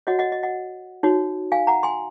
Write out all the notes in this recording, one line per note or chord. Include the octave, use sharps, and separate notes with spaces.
F#4 C#5 D#5 F#5
D#5 F#5
D#5
D#5 F#5
D#4 F#4 C#5
F5 G#5
F#5 A#5
G#5 C6